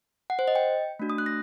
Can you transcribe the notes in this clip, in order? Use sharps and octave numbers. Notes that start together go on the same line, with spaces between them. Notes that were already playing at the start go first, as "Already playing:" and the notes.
F#5
C5
D#5
G5
A3 D4 F#4
D#6
F#6
A#6